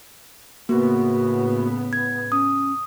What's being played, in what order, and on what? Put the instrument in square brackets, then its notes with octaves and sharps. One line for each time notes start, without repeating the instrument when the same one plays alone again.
[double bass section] A2 C#3 B3 [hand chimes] A#3 [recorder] F#4
[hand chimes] G#6
[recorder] C#4 [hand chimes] D#6